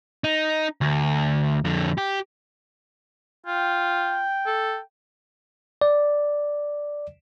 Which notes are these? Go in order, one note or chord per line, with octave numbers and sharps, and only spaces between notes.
D#4
D2
F2 D3
G4
F4 G5
A4
D5